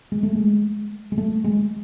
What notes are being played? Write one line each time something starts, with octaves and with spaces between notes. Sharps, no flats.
G#3
A3
G#3
G#3
A3
G#3